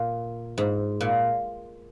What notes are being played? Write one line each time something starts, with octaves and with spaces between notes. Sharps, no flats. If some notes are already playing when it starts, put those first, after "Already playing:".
Already playing: A#2
G#2
A#2